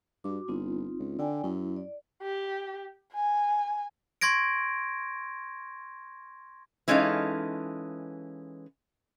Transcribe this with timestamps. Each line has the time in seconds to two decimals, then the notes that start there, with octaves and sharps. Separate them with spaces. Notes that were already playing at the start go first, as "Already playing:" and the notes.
0.24 G2 F#4 D6
0.48 G1 C4 D#4 F4
0.99 C#2
1.19 D3 D5 G5 G#5
1.44 F#2 E4
1.76 D5
2.22 G4
3.13 G#5
4.21 C6 C#6 G#6 A#6 D7
6.88 E3 G#3 C#4 D#4 A4 F5